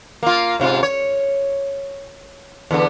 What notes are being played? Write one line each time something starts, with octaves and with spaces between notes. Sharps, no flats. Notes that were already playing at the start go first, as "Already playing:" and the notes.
A#3 F4
G#2 C3 F4
C#5
E2 D3 B3